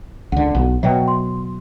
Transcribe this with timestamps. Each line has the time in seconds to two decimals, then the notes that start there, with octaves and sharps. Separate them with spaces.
0.32 C#2 D3 F#5
0.55 B1
0.83 B2 F#3 E5 G5
1.08 C6